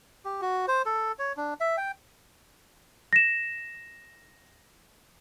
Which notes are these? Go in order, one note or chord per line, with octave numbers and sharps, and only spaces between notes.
G4
F#4
C5
A4
C#5
D4
E5
G5
A#6 E7